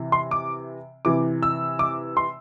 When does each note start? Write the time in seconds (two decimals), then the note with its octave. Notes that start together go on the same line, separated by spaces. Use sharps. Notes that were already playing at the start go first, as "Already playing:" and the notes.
Already playing: C3 E3
0.12 C6
0.31 D6
1.05 C3 E3 D6
1.43 E6
1.79 D6
2.17 C6